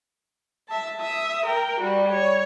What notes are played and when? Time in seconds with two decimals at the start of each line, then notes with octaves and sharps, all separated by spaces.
0.68 E5 A5
0.99 E5 D#6
1.44 A#4 G5
1.79 G3 F#4
2.10 C#5